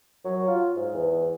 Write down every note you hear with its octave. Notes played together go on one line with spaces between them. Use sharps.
F#3
F4
G#2
E2